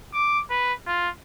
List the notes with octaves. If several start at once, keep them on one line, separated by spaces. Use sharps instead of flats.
D6
B4
F4